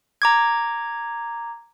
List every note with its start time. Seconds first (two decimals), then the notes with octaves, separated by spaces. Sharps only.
0.22 A#5 D6 G#6